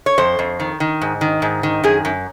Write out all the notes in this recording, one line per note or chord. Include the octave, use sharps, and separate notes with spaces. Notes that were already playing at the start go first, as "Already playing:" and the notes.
C#5
F2 C5
F2
D#3
D#3
G#2
D#3
G#2
D#3
F#2 G#4
F#2